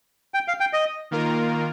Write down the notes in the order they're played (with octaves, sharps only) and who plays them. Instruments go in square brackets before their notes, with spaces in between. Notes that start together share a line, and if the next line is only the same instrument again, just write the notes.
[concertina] G5
F5
G5
D#5
[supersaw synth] D#3 A#3 F4 A#4